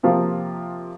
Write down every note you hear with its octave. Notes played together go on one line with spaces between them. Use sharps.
C3 F3 A#3 F4